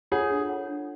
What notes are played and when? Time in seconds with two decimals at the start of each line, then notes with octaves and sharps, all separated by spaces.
0.12 F4 G#4 A4 C#5 F#5
0.30 D4
0.49 F4 A4 C#5 F#5
0.67 D4